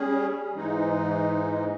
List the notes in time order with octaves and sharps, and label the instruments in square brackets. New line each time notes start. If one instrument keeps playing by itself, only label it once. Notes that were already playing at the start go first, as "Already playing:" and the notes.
Already playing: [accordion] G3 C#4 G#4
G#2 E3 G#3 D#4